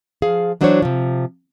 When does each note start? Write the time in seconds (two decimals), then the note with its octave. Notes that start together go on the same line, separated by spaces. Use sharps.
0.22 F3 G#4 F5
0.61 E3 F#3 D4 F#4 C5 C#5
0.82 C3 F3